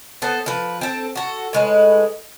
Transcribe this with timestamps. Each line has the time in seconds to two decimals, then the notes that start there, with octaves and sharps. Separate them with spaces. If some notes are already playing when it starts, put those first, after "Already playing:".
0.22 B3 A4 C5
0.46 F3 B4
0.81 C4 A4
1.15 F#4 A4
1.53 A2 G#3 B4